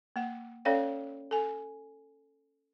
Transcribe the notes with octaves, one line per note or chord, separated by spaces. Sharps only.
A#3 F#5
C#4 A4 C#5 D5 F5 G5
A4 G#5